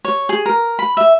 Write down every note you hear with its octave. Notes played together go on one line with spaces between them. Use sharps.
C#5
G#4
A#4
B5
E5